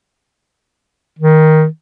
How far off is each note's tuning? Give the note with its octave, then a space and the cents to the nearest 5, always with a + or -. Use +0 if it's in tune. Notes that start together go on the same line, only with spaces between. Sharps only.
D#3 +10